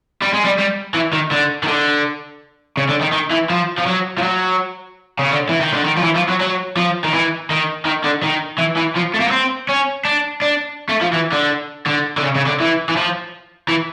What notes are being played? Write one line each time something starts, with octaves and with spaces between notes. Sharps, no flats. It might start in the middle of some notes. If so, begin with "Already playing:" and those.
G3
G#3
G3
G3
E3
D#3
D3
D#3
D3
C#3
D3
D#3
D#3
E3
F3
F3
F#3
F3
F#3
C#3
D3
E3
D#3
D3
D#3
F3
E3
F3
F#3
F#3
F3
D#3
E3
D#3
D#3
D3
D#3
E3
E3
F3
A3
A#3
B3
C4
C#4
D4
D4
A3
F3
E3
D3
D3
D3
C#3
C#3
D3
E3
E3
F3
E3